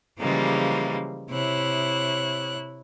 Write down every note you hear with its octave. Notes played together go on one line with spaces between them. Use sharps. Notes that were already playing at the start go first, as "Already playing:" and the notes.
C#3 E3 F3 G3 G#3 A#3
C3 E4 C#5 F#6